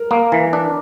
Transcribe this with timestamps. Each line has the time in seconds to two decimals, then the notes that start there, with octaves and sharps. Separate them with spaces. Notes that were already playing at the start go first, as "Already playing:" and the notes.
Already playing: A#4
0.11 A#3
0.32 E3
0.53 D4